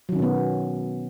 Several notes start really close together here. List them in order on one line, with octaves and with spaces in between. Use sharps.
F#3 D#3 C#4 B2 B3